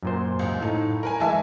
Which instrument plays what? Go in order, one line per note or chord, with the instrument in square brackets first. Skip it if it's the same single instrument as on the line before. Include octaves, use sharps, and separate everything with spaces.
[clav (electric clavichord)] F#2 A#2 C5
[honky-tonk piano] C#2
[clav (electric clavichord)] A2 [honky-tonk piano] D#4
[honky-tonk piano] A#4 B4 G#5
[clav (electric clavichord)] E3 G#3 [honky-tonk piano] E5 G#5 A5